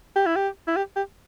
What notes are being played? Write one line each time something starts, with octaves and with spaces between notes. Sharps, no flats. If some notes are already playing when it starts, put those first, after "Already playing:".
G4
E4
G4
E4
G4
G4